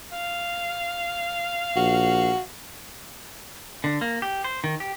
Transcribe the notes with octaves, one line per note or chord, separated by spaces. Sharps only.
F5
A#1 F#4
D3
A#3
G4
C5
D#3
G4